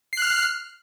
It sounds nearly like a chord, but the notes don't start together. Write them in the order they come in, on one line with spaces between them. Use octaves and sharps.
C7 F#6 F6